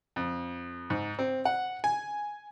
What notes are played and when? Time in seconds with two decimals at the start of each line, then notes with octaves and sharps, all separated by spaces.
0.16 F2
0.90 G#2
1.19 C4
1.45 F#5
1.84 G#5